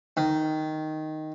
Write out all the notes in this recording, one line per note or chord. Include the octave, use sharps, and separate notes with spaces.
D#3